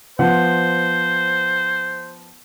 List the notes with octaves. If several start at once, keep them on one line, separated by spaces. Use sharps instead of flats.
F3 B3 C5 F#5